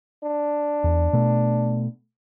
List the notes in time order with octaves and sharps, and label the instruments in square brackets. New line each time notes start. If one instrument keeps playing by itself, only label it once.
[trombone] D4
[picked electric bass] E2
B2 A3